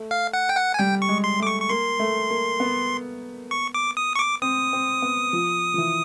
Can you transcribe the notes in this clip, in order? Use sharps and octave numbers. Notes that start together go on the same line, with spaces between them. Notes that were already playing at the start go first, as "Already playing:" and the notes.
Already playing: A3
F5
F#5
G5
F#5
G#5
G3 G5
C#6
G#3
C6
A3 D6
C#6
C#6
A#3 C6
A3
A#3
B3
C#6
D6
D#6
C#6
D6
C4 D#6
C4
B3
F3
F3
E3